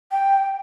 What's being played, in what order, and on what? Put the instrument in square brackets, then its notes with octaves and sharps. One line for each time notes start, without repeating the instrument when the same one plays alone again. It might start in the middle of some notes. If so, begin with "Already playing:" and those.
[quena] G5